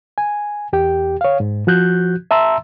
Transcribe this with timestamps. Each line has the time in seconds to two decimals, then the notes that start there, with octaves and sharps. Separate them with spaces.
0.18 G#5
0.73 E2 G4 G5
1.21 C#5 F5
1.40 G#2
1.67 F3 F#4 F#6 G6
2.31 E5 A5 A#5 C6 E6